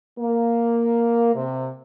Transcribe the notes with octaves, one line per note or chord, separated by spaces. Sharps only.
A#3
C3